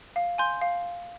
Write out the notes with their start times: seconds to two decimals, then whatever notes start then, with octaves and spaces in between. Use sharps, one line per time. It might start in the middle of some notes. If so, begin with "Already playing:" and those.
0.16 F5
0.38 G#5 C6 G6
0.61 F5